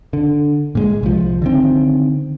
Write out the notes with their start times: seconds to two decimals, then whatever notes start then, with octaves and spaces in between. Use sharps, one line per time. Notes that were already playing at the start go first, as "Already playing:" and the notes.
0.13 D3
0.75 A#2 G#3
1.03 C2 F3
1.42 D3 D#3 C4